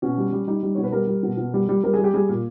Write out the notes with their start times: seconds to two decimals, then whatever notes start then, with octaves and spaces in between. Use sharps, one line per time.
0.02 B2 C#4
0.18 G3
0.33 G3
0.47 G3 D#4
0.63 G3
0.75 B2 C#5
0.83 B4
0.92 G3 A#4
1.07 G3
1.23 B2
1.37 B2
1.54 G3
1.69 G3
1.84 G3 A#4
1.94 G3 G#4
2.04 G4
2.14 G3 G#4
2.29 A#2